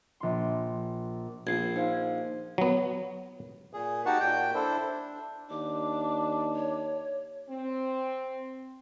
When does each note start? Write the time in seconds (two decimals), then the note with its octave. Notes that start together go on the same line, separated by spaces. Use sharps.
0.20 A#1 C6
1.47 A#1 G#6 C7
1.76 D#4 C5 F5
2.58 F#3 B3
3.74 A#2 G#4
4.06 D#4 F#4 G4 F#5 A5 C#6
4.20 A#2 G5 G6
4.55 D4 E4 A4 C5
4.85 D4
5.50 D#2 D4 D6
6.56 C#5
7.49 C4